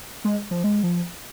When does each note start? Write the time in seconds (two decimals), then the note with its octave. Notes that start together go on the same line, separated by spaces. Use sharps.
0.25 G#3
0.51 F3
0.64 G#3
0.83 F3